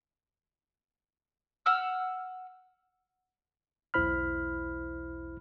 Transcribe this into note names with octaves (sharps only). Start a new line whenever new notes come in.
F#5 E6 F6
B1 E2 E4 C5 B5 F6